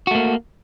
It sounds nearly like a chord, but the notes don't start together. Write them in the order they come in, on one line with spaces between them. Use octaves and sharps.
F#4 A3 A#3